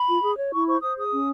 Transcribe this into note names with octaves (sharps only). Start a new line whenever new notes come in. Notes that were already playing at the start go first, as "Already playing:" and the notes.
Already playing: B5
F4
G#4
C#5
E4 C#6
C5 C#6
C5 D#6
G#4 D#6
C#4